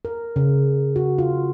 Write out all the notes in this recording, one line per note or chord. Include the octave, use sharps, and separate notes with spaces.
A#4
C#3
F#4
F4